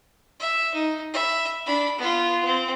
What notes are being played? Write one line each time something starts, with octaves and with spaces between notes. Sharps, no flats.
E5
D#4
E5 B5
D4 B5
B3 F4
C4